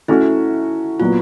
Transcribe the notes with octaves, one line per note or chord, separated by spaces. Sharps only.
A3 C#4 E4 F#4
A#2 F#3 B3 F4